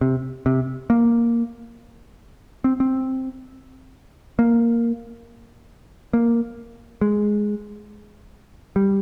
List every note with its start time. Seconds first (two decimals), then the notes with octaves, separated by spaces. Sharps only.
0.01 C3
0.46 C3
0.90 A#3
2.64 C4
2.80 C4
4.39 A#3
6.13 A#3
7.01 G#3
8.76 G3